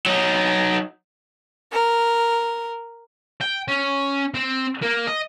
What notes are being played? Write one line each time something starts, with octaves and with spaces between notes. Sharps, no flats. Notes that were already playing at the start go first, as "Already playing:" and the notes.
F#3 D#4
A#4
G5
C#4
C4
A#3
D#5